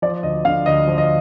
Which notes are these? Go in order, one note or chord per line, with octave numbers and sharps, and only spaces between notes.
F3 D5
D2 D#5
D3 F5
D2 D#5
F3
D#5